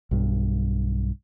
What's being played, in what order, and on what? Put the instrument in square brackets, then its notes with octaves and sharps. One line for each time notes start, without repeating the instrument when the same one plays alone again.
[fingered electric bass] B1 G2